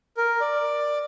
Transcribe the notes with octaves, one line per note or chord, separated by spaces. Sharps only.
A#4
D5